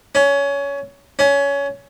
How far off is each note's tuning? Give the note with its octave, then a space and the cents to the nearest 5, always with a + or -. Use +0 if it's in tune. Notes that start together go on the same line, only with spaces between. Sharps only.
C#4 +20
C#4 +20